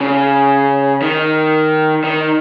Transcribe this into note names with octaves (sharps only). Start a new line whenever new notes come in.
C#3
D#3
D#3